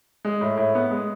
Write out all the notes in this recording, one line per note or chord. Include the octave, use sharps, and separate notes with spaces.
G#3
A2
A2
B3
G#3